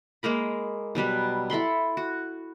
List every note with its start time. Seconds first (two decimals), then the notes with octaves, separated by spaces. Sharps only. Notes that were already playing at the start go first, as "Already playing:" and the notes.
0.23 G#3 A#3 A#4 B5
0.95 B2 F#3 G3 B4
1.50 E4 A4 B5 C6
1.97 F#4